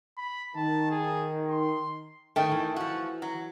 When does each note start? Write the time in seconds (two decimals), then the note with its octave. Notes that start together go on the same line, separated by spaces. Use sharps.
0.18 B5
0.55 D#3 A5
0.91 G#4
1.51 C6
2.36 D#3 A3 G5
2.52 E3
2.76 F3 F#4
3.22 F#3